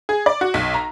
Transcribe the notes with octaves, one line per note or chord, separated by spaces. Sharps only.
G#4
D5
F#4
B1
A#5